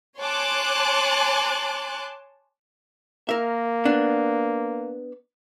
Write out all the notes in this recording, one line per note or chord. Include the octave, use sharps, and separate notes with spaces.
C#5 G#5 A5 C6 D6 F#6
A#3 A#4 E5
B3 D4